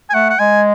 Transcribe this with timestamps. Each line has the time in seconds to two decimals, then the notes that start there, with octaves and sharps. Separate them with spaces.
0.10 G#5
0.14 A3 F#5
0.30 F#5
0.39 G#3 G#5